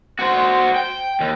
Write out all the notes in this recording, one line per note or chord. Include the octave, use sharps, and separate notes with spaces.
F#4 C5
G5
D#2